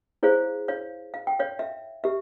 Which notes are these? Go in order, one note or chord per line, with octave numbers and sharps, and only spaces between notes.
E4 G#4 C5 C#5 F5
C#5 F5
F5
G5
C#5 F5
E5
G4 E5